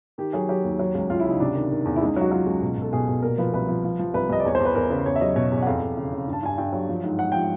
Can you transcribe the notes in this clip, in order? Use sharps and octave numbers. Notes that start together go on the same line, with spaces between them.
D#3 G4
F#3 G#4
F#3 G4
D#2
F#3
C#2
C#2 F4
E4
C#3
D#4
C3 D4
D#3
D#3
E2
E4
C#2 D#4
F#3 F#4
F#3 F4
C#2
B2
B2 A4
B2 G#4
B2
A#2 A#4
F3 B4
C2 B4
F3
F3
F3
C2 B4
C2 D#5
D5
E2 C#5
C5
E2 B4
E2 A#4
C#3 B4
E2 C#5
E5
F#3 D#5
B2 C#5
E2
F#5
F2 F5
F2
C#3
C#3
G2
A5
G2 G#5
G2 G5
F#3
F3
G#2
G#2 F#5
F3 G5